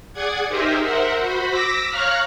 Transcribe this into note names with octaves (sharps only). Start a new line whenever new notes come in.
G#4 D5 F#5 G#6
D#4 G4 G#4 A#4 C5 E5
A#4 C5 E5 F#5
F#4 C5 B5
D6 E6 A#6 B6
C#5 F5 A#5 C#6 F6 F#6